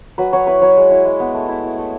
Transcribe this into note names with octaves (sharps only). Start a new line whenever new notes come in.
F#3 B4
F#3 C#5
E4 B4
F#3 C#5
G#3
E4
G#3
B3
A3
E4
E4
A3